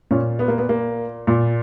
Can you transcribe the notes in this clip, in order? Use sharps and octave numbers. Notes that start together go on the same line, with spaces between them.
A#2 C#4
B3
A#3
B3
A#3
A#2